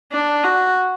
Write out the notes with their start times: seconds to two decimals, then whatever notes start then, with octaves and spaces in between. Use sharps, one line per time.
0.13 D4
0.44 F#4